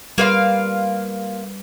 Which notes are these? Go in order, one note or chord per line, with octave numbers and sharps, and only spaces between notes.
G3 A#3 F4 B4 F5